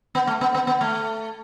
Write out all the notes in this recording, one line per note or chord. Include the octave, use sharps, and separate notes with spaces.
B3
A3
B3
B3
B3
A3